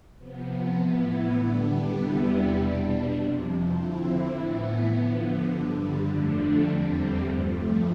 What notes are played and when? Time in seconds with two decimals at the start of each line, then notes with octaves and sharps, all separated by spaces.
0.18 C3 F3 B3
0.76 A2 E3 B3 E4
1.34 D3 G3 B3 D4
1.93 E2 C3 G3 B3 E4
2.52 B2 G3 D4
3.10 F2 C3 F3
3.69 D3 F3 C4 E4
4.28 A2 E3 B3 E4
4.86 D3 F3 B3
5.45 G2 D3 G3
6.03 F2 D3 F3 A3 D4
6.61 E2 D3 G3 C4
7.21 G2 F3 A3